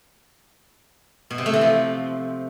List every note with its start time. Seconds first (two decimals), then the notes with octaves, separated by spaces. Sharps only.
1.30 B2
1.38 C3
1.46 A3
1.53 E3
1.61 F3